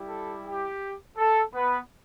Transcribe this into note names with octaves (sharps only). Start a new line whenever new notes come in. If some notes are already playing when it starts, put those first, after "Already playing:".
Already playing: G3 E4 G4
A4
G4
A4
B3 B4